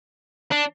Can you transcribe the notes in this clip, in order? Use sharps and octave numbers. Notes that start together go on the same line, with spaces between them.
D4